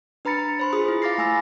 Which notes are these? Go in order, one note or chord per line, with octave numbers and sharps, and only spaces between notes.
D4 B4 A#5 B5 A6 C#7
C5 B5 C6
F4 G#4 D#6 C#7
E4
F5 B5 D6 A6 A#6 C7
A3 G#5 B5 E6 A#6